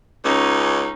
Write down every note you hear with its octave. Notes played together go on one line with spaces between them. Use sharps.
C#2 C#4 D#4